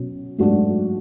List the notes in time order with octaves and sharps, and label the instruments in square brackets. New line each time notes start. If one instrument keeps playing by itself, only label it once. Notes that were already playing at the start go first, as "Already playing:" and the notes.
Already playing: [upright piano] B2 F#3 C#4
G#2 F#3 A3 D4 F#4